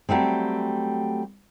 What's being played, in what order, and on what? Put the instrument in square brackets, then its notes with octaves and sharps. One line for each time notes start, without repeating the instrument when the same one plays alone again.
[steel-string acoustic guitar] F#3 G3 A3 C4